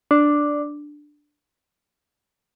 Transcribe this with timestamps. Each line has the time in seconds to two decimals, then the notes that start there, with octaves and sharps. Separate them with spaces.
0.11 D4